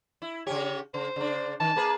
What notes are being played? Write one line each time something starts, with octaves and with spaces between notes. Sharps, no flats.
E4
C#3 C#4 G4 C#5
C#3 C5
C#3 D4
D#3 A5
A#3 G#4 B4